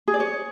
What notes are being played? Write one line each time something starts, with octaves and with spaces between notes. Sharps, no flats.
G#4
D5
C#5